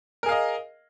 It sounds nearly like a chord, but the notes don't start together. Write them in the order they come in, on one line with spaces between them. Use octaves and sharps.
A#4 G#4 F5 D#5